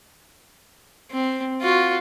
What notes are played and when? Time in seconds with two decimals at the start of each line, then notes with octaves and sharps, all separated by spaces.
1.11 C4
1.62 F4 F#4